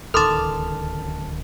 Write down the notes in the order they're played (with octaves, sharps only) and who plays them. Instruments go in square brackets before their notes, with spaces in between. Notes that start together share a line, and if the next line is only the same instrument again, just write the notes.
[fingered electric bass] D1 C#2 D#3 [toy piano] A4 C6 D6 [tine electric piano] A5 F6